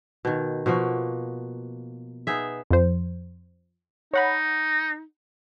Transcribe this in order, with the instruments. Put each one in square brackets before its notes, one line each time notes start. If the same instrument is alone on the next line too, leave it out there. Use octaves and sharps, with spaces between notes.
[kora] B2 D#3
B2 F3 A#3 F#4
B3 D#4 G#4 E5
[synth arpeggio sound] F2 F3 C5
[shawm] D#4 [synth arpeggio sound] C#5 F#5 B5